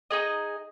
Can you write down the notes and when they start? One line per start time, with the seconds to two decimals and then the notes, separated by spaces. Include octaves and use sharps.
0.10 D#4 G#4 D#5